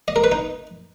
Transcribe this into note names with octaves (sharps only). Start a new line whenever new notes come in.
D#5
A#4
B4
D#4